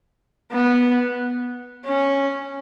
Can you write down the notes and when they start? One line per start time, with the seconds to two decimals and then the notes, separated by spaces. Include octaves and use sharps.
0.52 B3
1.85 C#4